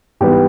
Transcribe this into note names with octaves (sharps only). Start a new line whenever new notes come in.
G#2 E3 G3 B3 G4